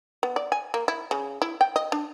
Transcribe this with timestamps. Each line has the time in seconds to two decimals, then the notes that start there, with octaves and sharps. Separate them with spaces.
0.23 B3
0.36 D5
0.52 G#5
0.74 A#3
0.88 E4
1.11 C#3
1.42 E4
1.61 G5
1.76 D#5
1.92 D4